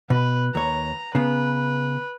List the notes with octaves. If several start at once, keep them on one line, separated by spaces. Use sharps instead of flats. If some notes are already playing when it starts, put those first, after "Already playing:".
B2 B4
D#2 C#5 A#5
C#3 B3 B4